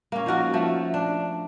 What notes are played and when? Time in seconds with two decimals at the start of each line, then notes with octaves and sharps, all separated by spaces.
0.12 A#3 C#4
0.26 F3 D#4 F#4 A#4
0.54 F3 A3
0.94 D4